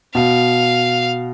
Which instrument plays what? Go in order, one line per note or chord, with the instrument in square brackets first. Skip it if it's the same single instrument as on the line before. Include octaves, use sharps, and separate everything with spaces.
[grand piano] B2 [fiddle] F5